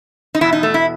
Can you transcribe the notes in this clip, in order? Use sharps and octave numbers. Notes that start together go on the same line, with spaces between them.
D#4
E2 B2 E4
D#4
A3
E4